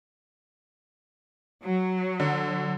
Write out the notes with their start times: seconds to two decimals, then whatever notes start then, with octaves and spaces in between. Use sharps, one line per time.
1.63 F#3
2.20 D3